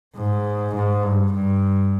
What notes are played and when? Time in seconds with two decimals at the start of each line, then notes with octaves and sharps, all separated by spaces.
0.16 G#2
0.75 G#2
1.03 G2
1.33 G2